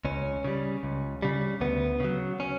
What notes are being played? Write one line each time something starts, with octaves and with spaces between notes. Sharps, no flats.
C#2 C#4
C#3 G3
C#2
C#3 G3
D2 B3
C#3 F#3
C#4